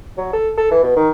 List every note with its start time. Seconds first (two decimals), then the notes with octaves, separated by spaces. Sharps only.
0.18 F#3
0.33 A4
0.58 A4
0.71 E3
0.83 B2
0.96 D#3